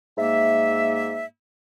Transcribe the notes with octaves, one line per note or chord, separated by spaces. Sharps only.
G#2 A#3 E5